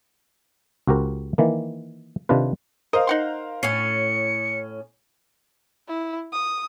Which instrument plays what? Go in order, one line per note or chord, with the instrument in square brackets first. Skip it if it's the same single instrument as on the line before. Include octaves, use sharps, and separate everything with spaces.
[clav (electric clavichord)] C#2 F#4 G4 A#4 C5
D#3 E3 A#3
C3 D#3 D4 F4 B4
[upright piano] A#4 C5 F5 [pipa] D#5
[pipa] D#4 F#5 C6
[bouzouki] A2 C#4 [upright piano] C7 [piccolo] C#7
[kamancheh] E4
D#6